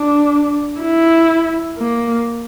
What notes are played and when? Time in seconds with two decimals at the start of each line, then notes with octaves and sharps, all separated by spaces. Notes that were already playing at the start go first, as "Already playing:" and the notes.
Already playing: D4
0.80 E4
1.78 A#3